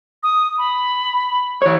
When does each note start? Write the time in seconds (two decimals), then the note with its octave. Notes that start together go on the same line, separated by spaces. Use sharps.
0.23 D#6
0.58 B5
1.62 E3 C#5